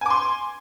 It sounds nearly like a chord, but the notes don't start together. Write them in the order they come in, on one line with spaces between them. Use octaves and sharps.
G#5 D6 C6